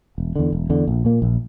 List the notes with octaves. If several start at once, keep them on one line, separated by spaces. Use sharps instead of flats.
E1
E2 D3
E1
E2 D3
A#1
A#2 A#3
A#1